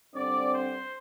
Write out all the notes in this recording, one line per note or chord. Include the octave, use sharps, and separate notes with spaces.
G2 D3 C4 D5
C5